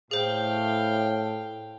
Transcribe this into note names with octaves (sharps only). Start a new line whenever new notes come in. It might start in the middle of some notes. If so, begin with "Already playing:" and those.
A2 G#4 C5 F5 G5